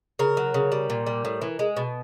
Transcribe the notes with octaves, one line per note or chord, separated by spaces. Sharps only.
C#3 A#4
F#3
C#3
G3
A#2
G3
A2
E3
G#3
B2